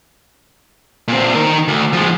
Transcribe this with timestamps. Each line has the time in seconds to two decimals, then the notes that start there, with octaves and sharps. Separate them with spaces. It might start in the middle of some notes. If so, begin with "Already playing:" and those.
1.08 A#2 C4
1.35 D#3 A#4
1.68 D2
1.93 F3 G#3